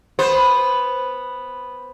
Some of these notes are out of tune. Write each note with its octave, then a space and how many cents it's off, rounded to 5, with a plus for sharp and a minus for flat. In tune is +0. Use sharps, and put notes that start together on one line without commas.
B3 +0 C5 +10